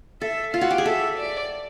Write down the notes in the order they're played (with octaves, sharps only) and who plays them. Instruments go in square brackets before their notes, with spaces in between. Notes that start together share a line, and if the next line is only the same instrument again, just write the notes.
[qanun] A4 [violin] E5
[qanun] F4 [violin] F5
[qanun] F#4
G4
G#4
[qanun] A4 [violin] E5
[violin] D5